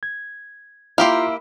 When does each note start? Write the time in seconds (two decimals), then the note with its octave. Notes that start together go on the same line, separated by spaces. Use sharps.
0.03 G#6
0.98 A#3 E4 F4 G4 F5 A#5 C6